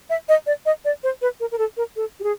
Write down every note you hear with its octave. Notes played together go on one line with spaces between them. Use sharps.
E5
D#5
D5
D#5
D5
C5
B4
A#4
A#4
A4
A#4
A4
G4
G#4